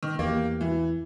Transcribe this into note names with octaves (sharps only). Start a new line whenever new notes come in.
D#3
E2 A#3 G4
E3